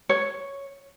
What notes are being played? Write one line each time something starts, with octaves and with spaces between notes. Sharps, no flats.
C#5